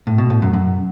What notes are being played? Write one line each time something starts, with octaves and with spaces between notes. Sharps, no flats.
A2
B2
A2
F#2
F#2